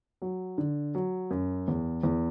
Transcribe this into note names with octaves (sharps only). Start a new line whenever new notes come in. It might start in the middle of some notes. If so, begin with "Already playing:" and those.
F#3
D3
F#3
F#2
E2
E2